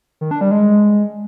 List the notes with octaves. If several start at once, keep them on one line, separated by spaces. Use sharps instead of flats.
D#3
D4
G3
G#3